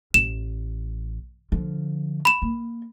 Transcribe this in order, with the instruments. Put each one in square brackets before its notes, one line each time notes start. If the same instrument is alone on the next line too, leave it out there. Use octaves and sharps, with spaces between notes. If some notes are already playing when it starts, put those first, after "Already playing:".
[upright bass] A1 [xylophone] E7
[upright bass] D3 F3
[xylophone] B5 E7
[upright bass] A#3